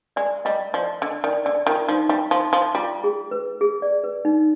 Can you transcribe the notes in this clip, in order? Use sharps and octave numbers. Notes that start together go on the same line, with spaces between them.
G#3 D5
G3 D#5
F3 D5
D3 D#5
D#3 D5
D3 D5
D#3 F4
F3 D#4
G3
F3
F3
G3 F4
G#4
B4
G#4
D5
B4
D#4